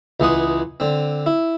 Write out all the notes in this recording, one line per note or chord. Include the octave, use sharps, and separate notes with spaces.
C#2 E3 G#3 G#4 F#5 D#6
D3 C4
E4